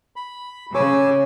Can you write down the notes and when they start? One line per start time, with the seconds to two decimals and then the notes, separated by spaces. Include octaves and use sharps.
0.16 B5
0.74 C#3 C#5 G#5 D6 E6